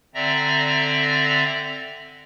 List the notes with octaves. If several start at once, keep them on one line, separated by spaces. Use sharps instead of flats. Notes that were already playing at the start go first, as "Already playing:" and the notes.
D3 C4 D5 E5 A#5 A#6